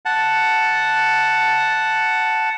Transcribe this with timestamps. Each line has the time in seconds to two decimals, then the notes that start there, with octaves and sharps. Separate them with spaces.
0.05 F#5 A5